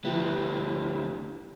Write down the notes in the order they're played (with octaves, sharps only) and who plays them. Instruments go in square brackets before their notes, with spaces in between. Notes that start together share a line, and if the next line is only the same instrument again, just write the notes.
[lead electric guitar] D2 B3 [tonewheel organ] F3 E4 G4